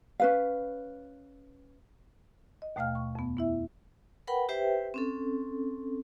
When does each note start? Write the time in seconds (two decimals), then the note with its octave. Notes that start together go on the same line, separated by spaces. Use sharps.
0.20 C#4 B4 F5
2.62 D#5
2.76 D#2 B2 A3 F5 G5 F6
2.95 C#6
3.15 F2 B3
3.37 B3 E4 E5
4.27 A#4 B4 F#5 G5 B5
4.49 G4 B4 C5 E5 G5
4.94 C4 C#4 A4